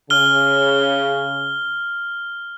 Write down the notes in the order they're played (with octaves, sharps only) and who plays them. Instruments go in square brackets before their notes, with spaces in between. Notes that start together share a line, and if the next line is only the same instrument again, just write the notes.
[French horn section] C#3 [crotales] F6 G7